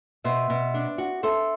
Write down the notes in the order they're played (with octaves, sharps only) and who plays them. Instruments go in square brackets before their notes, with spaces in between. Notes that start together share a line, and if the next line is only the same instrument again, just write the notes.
[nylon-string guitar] B2 [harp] C5 E5
[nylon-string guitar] B2
D4
F#4
[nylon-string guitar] A4 [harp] C5 E5